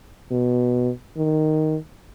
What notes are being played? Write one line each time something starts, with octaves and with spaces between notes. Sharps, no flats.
B2
D#3